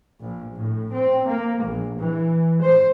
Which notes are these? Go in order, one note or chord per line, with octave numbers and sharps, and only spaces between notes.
A#1
A2
C4
A#3
A#1
E3
C5